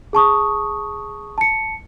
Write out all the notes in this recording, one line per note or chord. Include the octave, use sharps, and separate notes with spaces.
G#4 A5 C#6 D#6
A5 C#7